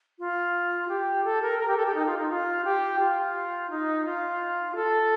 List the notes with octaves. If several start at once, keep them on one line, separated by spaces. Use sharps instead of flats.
F4
G4
A4
A#4
A#4
G4
A4
G4
D#4
F4
D#4
F4
G4
F4
D#4
F4
A4